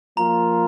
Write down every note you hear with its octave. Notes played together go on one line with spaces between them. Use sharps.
F3 A#3 F4 A#5